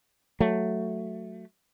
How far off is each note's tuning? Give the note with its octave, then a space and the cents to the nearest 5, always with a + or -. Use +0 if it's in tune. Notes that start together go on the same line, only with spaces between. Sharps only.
F#3 +0 A3 +5